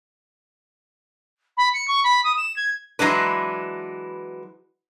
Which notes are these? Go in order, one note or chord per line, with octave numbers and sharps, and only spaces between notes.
B5
C#7
C#6
B5
D#6
E7
G#6
E3 F#3 G#3 D4 B4